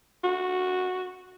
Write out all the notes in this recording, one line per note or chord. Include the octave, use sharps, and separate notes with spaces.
F#4